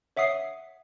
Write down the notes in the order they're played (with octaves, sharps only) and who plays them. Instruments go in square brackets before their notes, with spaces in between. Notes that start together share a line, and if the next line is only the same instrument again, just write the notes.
[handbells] C#5 E5 F#5 D#6 C7